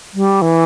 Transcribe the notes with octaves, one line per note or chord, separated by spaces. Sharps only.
G3
E3